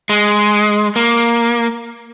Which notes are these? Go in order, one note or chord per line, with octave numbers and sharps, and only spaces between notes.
G#3
A#3